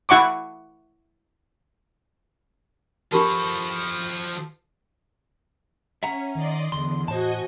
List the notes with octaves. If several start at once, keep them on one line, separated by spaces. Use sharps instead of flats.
E4 F#5 C#6 D6
F3 D4 G4 A4 A#4 A5 B5 C#6
C#4 E5 F#5 A#5
D#3 D5 D#5 C6
E2 D3 C6
A2 F#4 C5 D#5 G#5 A5